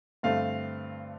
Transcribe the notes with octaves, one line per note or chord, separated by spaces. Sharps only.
G2 D3 A3 C4 F5